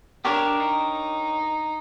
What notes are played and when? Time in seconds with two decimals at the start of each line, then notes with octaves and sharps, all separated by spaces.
0.24 D4 G4 A#4 C#5
0.60 D#4